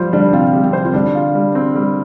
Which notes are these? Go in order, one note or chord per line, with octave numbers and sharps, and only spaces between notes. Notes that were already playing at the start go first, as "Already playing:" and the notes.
Already playing: F3 G3 F4 C5
D3 G3 D4
C3 C4 F4
G3
C3 C4
C5
F4
D3 G3 D4
F4
G3
C4
G3